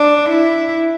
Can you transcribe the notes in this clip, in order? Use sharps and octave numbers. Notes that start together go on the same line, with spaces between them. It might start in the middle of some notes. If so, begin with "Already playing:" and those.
Already playing: D4
E4